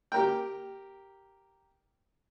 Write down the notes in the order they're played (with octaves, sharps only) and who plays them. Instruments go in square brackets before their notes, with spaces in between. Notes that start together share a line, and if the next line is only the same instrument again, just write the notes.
[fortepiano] G4 A#4 G5